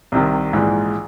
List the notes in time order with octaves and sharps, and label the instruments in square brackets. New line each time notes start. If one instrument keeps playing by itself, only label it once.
[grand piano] C2 C3 D#3
A#1 G#2 E3